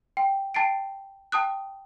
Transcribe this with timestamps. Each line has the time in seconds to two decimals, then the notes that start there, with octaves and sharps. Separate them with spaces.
0.17 G5
0.54 G5 A5 A6 C7 D7
1.32 G5 A5 D#6 F#6